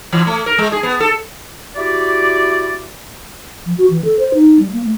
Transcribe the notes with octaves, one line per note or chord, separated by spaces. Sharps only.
E3
A3
A#4
G#3
G#4
B3
A4
E4 F#4 G4 D5
F3
F#4
E3
A4
C5
D#4
G3
A#3
A3